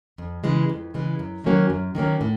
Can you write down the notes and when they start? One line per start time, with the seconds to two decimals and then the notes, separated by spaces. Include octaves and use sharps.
0.18 F2
0.44 C#3 E3 G#3
0.69 F2
0.94 C#3 E3 G#3
1.19 F#2
1.44 D#3 F#3 A#3 C#4
1.70 F#2
1.95 D#3 F#3 A#3 C#4
2.21 A2